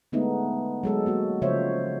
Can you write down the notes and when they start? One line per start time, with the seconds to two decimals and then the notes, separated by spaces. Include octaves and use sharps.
0.12 D3 G#3 A3 B3 D#4
0.83 F#3 G#3 A4
1.06 G#3 A#3 F#4
1.42 C#3 F3 C5 C#5 E5